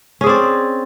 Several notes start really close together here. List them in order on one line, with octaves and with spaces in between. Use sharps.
C#4 G#4 C4 D5